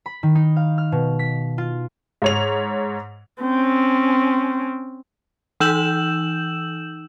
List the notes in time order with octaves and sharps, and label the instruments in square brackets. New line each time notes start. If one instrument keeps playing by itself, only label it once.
[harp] B5
D#3
D#4
F5
F6
B2
B6
F4
[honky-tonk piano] G#2 C#5 F7
[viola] C4 C#4
[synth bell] E3 D#4 E6 G6 E7 F#7